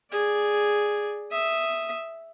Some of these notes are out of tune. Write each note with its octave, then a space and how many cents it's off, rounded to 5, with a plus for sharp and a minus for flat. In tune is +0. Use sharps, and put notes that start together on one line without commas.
G#4 +0 D5 +0
E5 +0 D#6 +0